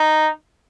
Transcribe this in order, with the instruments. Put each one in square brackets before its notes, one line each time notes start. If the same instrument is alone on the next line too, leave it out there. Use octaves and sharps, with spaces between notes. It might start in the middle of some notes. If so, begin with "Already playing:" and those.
Already playing: [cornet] D#4